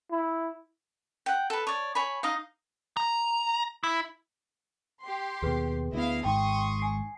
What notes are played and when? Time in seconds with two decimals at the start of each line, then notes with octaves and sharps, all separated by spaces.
0.11 E4
1.26 F#5 G5
1.50 A4 B4
1.67 C#5 D5
1.95 C#5 G#5 B5
2.23 D#4 D#5 F5
2.97 A#5
3.84 E4
5.03 G4 C6
5.42 D#2 B2 G#4 B4
5.93 D2 B3 E4 D#5 F5
6.24 G#1 G#2 G5 C6 C#6 D#6
6.80 G#5 C7